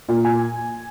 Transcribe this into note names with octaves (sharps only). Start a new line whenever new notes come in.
A#2
G#5